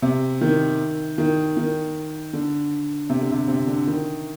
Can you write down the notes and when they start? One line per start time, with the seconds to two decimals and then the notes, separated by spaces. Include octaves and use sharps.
0.02 C3
0.41 D#3
1.18 D#3
1.57 D#3
2.33 D3
3.09 C3
3.21 D3
3.31 C3
3.48 C3
3.67 D3
3.87 D#3